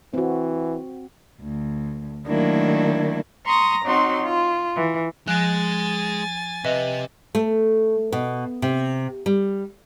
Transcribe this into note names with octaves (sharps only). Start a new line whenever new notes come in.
E3 C4 F#4
D2
D#3 F#3 A3 A#3 D4 E4
A#5 C6 C#6 D#6 A#6
F#3 C4 D#4 F#4 C6
F4
E3
F3 G#3 G#4 G#5 F#6 A6 D7
C3 B4 D#5 E5
A3
B2
C3
G3